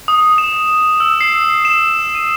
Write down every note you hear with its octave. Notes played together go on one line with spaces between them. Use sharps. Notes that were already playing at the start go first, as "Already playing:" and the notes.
D#6
E7
E6
C7
E7
D#7